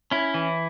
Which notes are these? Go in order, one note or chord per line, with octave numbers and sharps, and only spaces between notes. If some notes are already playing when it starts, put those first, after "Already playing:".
C#4 E4
E3